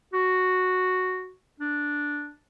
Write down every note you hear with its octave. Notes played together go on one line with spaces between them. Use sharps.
F#4
D4